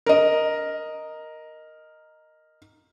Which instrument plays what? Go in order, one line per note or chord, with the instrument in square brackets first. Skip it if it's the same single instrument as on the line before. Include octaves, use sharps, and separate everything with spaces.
[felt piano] A#4 D#5